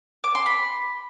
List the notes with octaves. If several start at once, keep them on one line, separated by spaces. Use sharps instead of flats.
D6
C6
B5